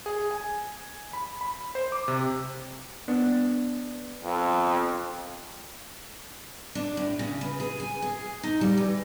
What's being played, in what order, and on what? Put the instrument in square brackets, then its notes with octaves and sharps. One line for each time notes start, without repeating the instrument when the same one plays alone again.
[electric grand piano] G#4
G#5
B5
B5
C5
D6
C3
[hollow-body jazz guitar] B3 D4
[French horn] F2
[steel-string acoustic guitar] D4
A2
C#3
B4
G#4
G#5
G#4
D#4
G3
E3